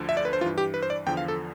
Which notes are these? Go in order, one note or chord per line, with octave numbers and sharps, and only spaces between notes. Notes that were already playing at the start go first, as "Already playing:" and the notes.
Already playing: D2 D3 F3
E5
D5
B4
C5
G2 E3 F4
G4
B4
C5
D5
E2 D3 F3 G5
F5
A4